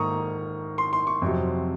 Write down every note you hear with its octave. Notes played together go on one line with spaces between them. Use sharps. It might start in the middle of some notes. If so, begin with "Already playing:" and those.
Already playing: G#2 D#3 A#3 A#5 C#6 D#6
C6
C6
C#6
F2 C3 F#3